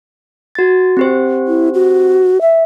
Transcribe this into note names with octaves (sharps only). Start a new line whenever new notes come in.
F#4 A6
C4 G4 C5
E4
F#4
E5